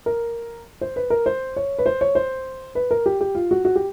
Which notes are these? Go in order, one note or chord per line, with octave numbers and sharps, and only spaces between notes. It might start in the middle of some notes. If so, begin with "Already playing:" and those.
A#4
C5
B4
A#4
C5
C#5
B4
C5
C#5
C5
B4
A#4
G4
G4
F4
F#4
F#4
G4